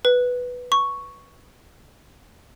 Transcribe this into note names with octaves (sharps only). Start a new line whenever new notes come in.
B4
C#6